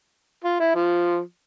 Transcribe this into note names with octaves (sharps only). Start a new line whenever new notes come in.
F4
E4
F3